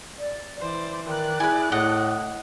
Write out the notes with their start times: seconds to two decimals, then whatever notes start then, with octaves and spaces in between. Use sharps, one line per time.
0.18 D5
0.60 E3 C5 D5
1.06 D#3 D5 F#6
1.40 E4 G#4 B4 G#5
1.72 A2 A3 D#5 F#5